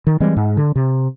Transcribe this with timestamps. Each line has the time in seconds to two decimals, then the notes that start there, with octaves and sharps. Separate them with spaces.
0.07 D#3
0.20 E3 G3 G#3 C4
0.37 G#2
0.57 D3
0.76 C3